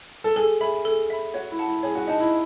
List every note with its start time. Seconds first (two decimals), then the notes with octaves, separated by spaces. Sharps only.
0.24 A4
0.36 G#4 A4
0.61 G#4 E5 B5
0.85 G#4 A4
1.10 E5 B5
1.34 F#4 C#5
1.51 E4
1.59 F#5 A5
1.68 E4
1.83 G#4 C#5
1.95 F#4
2.07 D#4 F#5 A5
2.20 E4